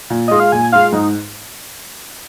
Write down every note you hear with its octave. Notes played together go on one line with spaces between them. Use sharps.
A#2
G#3 F4 D#5
F5
A#2 G#5
G#3 F4 F5
G#2 D#4